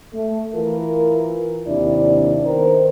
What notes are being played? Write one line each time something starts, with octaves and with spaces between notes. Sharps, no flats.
A3
E3 F4 A#4
D#2 C3 D4 E4 D5
D#3 B3 A#4 C5